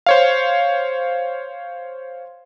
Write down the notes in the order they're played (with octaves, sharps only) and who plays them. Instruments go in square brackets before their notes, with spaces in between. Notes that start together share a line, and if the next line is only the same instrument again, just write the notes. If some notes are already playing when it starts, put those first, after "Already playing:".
[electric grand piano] C5 C#5 F5